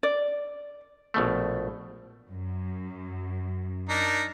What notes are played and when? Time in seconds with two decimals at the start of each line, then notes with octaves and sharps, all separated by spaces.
0.03 D5
1.14 A#1 B2 A3
2.29 F#2
3.89 D4 D#4 A#4